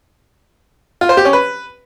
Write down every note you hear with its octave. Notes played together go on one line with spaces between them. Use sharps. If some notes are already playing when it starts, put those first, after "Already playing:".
F4
C5
G4
C#4
B4